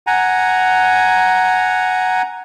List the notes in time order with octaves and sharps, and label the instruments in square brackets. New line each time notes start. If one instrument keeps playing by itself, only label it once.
[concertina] F#5 G#5 A#5